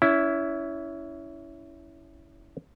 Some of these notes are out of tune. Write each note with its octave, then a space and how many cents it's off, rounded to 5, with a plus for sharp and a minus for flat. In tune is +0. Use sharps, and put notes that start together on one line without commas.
C#4 +25 E4 +0